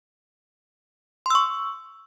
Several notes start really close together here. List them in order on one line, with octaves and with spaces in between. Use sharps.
C6 E6 C#6